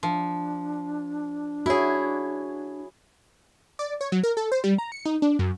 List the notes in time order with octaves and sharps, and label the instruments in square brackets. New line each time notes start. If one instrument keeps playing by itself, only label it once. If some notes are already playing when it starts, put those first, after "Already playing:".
[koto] F3 [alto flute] D4
[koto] E4 G#4 [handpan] F#4 C#5
[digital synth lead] D5
C#5
F#3
A#4
A4
C5
G3
A#5
C#7
D#4
D4
F#2